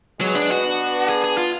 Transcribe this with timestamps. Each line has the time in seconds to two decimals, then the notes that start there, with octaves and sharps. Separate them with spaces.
0.20 F#3 G#3 B3
0.35 D4
0.50 F#4
0.65 B3 D4
1.09 G#4
1.24 G#4
1.38 F4